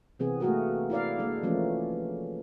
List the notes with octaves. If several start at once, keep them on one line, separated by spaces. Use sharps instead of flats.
C3 E3 B3 C4 G#4
A3 A#3 F#4 G#4 A#4
E4 A#4 D5 F5
G#3 A#3 D4
E3 F3 A3 A#3 C#4